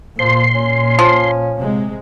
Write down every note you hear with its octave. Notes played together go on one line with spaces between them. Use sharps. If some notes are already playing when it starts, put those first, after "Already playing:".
A#2 F3 C6
C#4
F3
C3 G#3